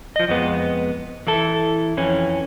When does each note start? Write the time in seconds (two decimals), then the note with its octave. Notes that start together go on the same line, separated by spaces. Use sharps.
0.16 F3 D#5
0.29 F2 G#3 B3
1.27 E3 E4 A4
1.97 F2 E3 C#4